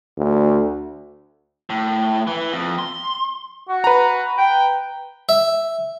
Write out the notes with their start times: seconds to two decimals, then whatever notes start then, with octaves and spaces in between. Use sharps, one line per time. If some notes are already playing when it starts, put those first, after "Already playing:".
0.18 D2
1.70 A2
2.27 E3
2.52 F2
2.79 C6
3.69 F#4
3.84 B4 A#5
4.38 G5
5.29 E5